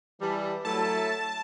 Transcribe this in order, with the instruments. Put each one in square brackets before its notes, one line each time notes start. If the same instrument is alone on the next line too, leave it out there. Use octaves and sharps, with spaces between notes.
[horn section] E3 G3 A5
[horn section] F#3 A3 E4 [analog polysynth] A5